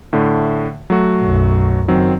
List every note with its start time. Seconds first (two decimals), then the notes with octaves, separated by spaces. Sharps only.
0.13 A2 D3 A3
0.90 F#3 A3 F#4
1.21 B1 F#2
1.88 F#1 D#3 F#3 C4